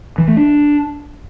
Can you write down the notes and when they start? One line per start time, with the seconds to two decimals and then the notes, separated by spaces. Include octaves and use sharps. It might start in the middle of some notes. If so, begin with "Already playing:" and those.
0.18 E3
0.27 A3
0.37 D4